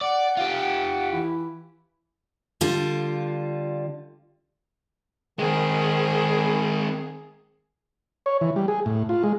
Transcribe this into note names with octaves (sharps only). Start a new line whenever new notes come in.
D5 F#5
F4 G4
E3 E4
D3 G3 F4
D#3 G#3 C4 G#4
C#5
E3
G3
G#4
A2
F4
G#3